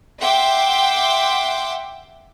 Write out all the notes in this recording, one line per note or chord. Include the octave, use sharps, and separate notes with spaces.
E5 F#5 G5 C6 D6